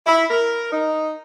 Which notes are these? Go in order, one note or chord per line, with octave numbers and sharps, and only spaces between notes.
E4
A#4
D#4